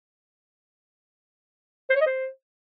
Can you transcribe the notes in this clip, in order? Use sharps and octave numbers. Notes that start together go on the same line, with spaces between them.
C5
C#5
D#5
C5